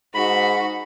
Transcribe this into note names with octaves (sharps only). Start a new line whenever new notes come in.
G#2 F#4 B5